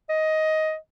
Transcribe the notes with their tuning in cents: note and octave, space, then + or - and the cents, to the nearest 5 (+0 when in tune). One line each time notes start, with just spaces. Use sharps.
D#5 +10